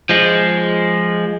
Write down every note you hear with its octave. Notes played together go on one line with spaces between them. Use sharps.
F3 G#3